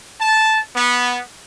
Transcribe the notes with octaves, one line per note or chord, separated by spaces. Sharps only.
A5
B3